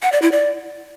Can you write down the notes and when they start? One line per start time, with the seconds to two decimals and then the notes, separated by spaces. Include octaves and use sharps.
0.02 F#5
0.12 D5
0.22 E4
0.32 D5